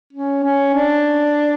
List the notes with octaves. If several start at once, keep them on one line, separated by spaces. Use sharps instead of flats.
C#4
C#4
D4